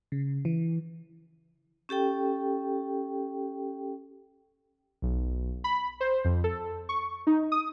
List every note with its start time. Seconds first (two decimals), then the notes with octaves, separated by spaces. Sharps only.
0.12 C#3
0.45 E3
1.89 C#4 G4 A4 G5
5.02 B1
5.64 B5
6.00 C5
6.25 F2
6.44 A4
6.89 C#6
7.27 D#4
7.52 D#6